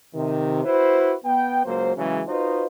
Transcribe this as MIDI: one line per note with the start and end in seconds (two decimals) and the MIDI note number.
0.14 0.63 48
0.14 0.63 51
0.65 1.14 64
0.65 1.14 66
0.65 1.14 71
0.65 1.14 72
1.25 1.64 59
1.25 1.64 79
1.65 1.95 37
1.65 1.95 54
1.65 1.95 58
1.65 1.95 72
1.96 2.21 49
1.96 2.21 52
1.96 2.21 54
1.96 2.21 56
1.96 2.21 61
2.28 2.66 63
2.28 2.66 65
2.28 2.66 66
2.28 2.66 71
2.28 2.66 72
2.28 2.66 75